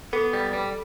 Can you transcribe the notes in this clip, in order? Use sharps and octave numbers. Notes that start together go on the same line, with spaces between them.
B3 A4
G3
G3